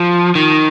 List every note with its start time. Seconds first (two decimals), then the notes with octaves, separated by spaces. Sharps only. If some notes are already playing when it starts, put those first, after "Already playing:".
Already playing: F3
0.35 D#3